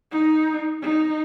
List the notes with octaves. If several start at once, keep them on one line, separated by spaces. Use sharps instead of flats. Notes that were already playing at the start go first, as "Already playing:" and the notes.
D#4
D#4